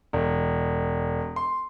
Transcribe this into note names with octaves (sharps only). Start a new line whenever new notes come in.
E1
C6